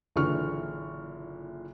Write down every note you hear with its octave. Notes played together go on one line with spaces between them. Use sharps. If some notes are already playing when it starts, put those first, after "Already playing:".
F#1 A#2 D3 E3 C#6 F6